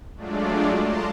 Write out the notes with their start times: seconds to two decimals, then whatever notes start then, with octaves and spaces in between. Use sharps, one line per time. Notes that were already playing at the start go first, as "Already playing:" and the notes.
0.16 F#3 G#3 A3 D4 F4 D5
0.79 A5 A#5 C6 D6